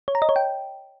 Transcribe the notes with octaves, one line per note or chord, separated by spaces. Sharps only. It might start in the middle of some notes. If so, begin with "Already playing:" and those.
C#5
A#5
D#5
C#5
G5